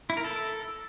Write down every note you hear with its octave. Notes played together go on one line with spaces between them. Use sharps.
E4
A#4
A4